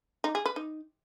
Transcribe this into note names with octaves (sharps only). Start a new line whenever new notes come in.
D#4
G#4
B4
D#4